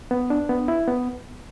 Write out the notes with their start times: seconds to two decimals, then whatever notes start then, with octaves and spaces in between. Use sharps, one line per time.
0.11 B3
0.30 D4
0.49 B3
0.68 E4
0.88 B3